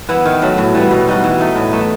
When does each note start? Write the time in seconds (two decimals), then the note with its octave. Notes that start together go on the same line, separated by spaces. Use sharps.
0.09 E3 B3 E4
0.25 D#3
0.42 F#3 A3
0.58 A2
0.74 E3 G3 B3
0.91 B2
1.07 G3 D#4 F#4
1.24 E3
1.40 A3 D#4
1.56 A2
1.72 E3 A3 D#4